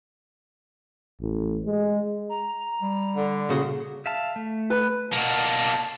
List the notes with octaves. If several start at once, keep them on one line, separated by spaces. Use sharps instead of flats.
A1
G#3
A#5
G3
D3
A#2 C#3 F#4 G#4
E5 F5 A5
A3
B4
B2 A#3 A5